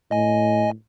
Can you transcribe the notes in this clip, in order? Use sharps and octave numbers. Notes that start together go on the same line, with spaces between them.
A2 D#5 G#5